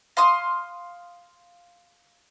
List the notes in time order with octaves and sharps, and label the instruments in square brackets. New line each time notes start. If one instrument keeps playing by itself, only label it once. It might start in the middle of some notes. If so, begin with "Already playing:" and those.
[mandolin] F5 C6 D#6